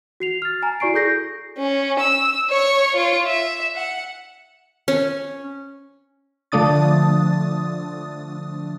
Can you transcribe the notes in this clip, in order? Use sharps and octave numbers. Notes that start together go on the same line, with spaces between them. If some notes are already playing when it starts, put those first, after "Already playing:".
F#4 C7 F7
F6 A6
G#5 A#5
E4 F#4 D5 C#6 C7 D7
G#4 A4 G6 A#6 C7
C#4
E6
C#5 C#6
F4 C#5
E5
F#5
C#4
D3 F3 A3 D4 D#6 A6